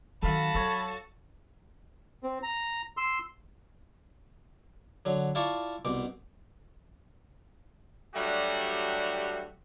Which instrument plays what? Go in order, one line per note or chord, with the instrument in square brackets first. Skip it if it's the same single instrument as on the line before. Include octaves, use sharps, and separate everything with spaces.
[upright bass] D#3 F#3 [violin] F#4 A5 [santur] A4 F5 [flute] B5
[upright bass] F#3 [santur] A4 C#5
[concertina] C4
A#5
C6 E6
[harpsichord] D3 F#3
E4 F4 D5 F5 A5 C#6
C2 B2 D6
[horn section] F#3 G3 A3 D4 F#4 G4